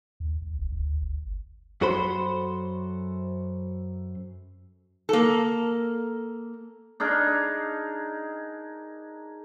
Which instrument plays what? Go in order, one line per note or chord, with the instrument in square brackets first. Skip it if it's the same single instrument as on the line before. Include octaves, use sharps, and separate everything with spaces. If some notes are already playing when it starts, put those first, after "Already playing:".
[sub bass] D#2
C2
E1
D2
G1
[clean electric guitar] F#2 F#4 A4 C5 B5 C6
[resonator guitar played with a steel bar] A#3 A4
[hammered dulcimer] D4 D#4 G#4 A#4